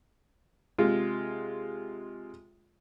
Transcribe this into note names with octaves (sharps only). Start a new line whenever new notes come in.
C3 G#3 F4